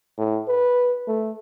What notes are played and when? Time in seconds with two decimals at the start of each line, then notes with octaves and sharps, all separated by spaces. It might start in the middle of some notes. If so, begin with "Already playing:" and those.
0.18 A2
0.48 B4
1.07 A3